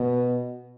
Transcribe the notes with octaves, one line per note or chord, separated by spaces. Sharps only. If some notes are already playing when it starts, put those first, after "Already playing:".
Already playing: B2